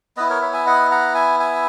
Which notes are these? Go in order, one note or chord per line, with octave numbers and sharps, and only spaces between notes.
B3 E4 B4 D#5
A#4 C#5
C#5 E5
E5 G#5
D#5 F#5
F#5 A#5
E5 G#5
E5 G#5